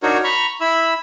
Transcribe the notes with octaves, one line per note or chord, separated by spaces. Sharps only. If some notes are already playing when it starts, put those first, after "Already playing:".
D4 D#4 F#4 A#4 C#5
A#5 B5 C#6
E4 B5 E6